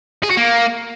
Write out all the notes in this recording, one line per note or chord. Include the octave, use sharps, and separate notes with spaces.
G#4
F#4
A#3